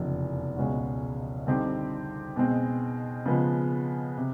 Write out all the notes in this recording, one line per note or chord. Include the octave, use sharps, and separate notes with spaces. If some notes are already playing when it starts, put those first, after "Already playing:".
Already playing: F1 E2 C#3 F3
C#2 B2 G#3 C#4 F#4
D3 G3 C4 D#4 G4
B2 G#3 C4
C#3 F3 G#3 B3
C3